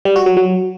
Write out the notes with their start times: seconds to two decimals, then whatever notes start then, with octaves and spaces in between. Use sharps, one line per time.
0.05 G3
0.16 F#4
0.26 F#3
0.37 F#3